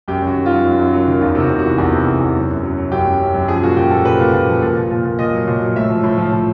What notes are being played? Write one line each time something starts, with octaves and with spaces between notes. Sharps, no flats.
F#2 G4
F#2 F#4
D#3
F#3 F4
F#2
F#2
F#3
D#3
E2 F4
C3
F#4
C3
E3 F#4
E2
C3
E2
E2
F#3
F#2
F#3
F#3
F#2 G4
F#2
F#2
F#2
F3 G#4
A#2 F#4
A#2 G4
F3 A4
A#2 B4
A#2
A#2
F3
A#2
A#2
A#2
A#2
A#2 D#5
F#3
A#2
F#3
A2 E5
F3
A2
F3
F3